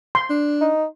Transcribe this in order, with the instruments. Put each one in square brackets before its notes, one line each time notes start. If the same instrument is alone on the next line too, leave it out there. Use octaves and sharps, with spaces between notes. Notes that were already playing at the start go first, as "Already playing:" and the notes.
[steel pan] C6
[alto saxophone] D4
[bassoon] D#4